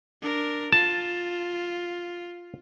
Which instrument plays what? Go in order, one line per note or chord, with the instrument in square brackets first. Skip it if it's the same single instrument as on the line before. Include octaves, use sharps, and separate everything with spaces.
[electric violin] D4 A#4
[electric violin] F4 [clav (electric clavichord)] A5